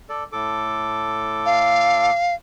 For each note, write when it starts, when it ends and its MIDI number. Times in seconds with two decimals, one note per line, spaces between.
0.09 0.23 69
0.09 0.23 74
0.33 2.10 45
0.33 2.10 69
0.33 2.10 86
1.46 2.35 77